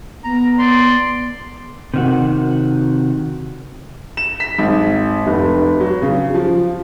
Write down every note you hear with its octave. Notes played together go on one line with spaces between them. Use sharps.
B3 A#5
D5 C6
C3 D#3 F#4
E7
B6
G#1
F1
F#3
C#3
F3